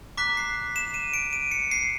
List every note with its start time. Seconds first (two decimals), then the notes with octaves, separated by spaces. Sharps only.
0.17 A#5 D6 F#6 B6
0.37 C7
0.76 E7
0.94 D#7
1.14 D7
1.33 D#7
1.51 C#7
1.71 C7